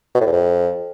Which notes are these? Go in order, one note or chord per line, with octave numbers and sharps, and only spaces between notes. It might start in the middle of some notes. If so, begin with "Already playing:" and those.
B2
A2
E2
F2